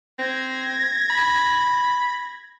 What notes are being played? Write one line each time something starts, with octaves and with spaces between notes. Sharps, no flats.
C4 G#6 A#6
B5